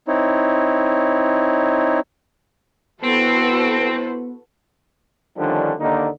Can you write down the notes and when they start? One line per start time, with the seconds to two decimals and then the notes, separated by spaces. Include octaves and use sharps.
0.08 C4 D#4 E4 C#5
3.04 B3 C4 E4 F#4 A4 B4 C5
3.80 B3
5.38 D3 D#3 F3 G3 C#4 D4
5.80 D#2 D3 A#3 D#4